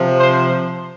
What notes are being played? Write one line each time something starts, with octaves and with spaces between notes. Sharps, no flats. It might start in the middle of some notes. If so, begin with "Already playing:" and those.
Already playing: C3 F3
C5